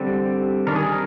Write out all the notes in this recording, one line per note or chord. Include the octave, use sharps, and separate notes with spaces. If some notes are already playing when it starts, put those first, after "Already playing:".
Already playing: D3 G3 C4
D#3 G3 D4 A#4
G#4
A#4